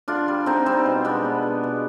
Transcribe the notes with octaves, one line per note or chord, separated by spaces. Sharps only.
D3 D4 F4
G3
D3 C4 D#4
G3 C4 D#4
B2
G#3 B3 D4
B2
G#3
B2